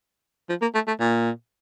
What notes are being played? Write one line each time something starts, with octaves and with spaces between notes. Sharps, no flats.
F3
A#3
A3
A3
A#2